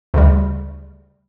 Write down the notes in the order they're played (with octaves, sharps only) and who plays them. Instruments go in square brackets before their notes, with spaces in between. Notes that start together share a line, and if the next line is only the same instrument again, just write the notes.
[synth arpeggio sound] D2 C#3 G3